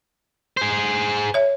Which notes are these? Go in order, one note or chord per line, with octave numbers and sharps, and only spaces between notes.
G#4 C5
C#5 E5